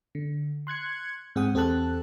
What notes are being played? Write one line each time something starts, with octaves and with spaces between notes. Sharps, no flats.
D3
C6 F#6 G#6 C#7
G#2 C4 G#4 F#5 D#6
E2 C4 G4 A4 A5 F#6